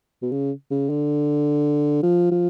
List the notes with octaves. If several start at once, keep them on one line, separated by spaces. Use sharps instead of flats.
B2
C#3
C#3
D3
F3
F3